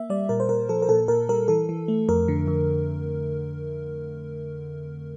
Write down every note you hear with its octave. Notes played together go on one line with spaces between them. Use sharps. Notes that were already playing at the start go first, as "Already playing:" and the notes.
Already playing: A#3 E5
G3 D5
A#2 A#4
C5
A#2 A#4
F3 A4
A#4
A#2 A4
A#2 A#4
G3 A#4
E3 A4
E3
A3
F2 A#4
D3
F2